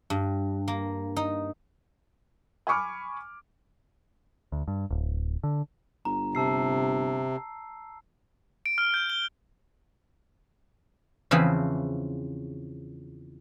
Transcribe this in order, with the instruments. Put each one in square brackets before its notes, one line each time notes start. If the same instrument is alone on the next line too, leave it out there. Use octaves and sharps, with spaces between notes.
[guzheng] G2
A#3
D#4
[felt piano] G#5 B5 C#6 D6 F6
[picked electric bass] D2
G2
D1
D3
[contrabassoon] G1 [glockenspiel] A#5
[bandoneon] C3 [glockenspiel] A5 E6 C7
[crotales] D7
F6
G6
G7
[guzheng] E2 C#3 E3 F3 C4 B5